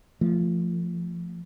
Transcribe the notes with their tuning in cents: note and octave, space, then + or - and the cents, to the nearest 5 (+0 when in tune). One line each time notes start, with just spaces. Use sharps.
F3 -15 A3 +20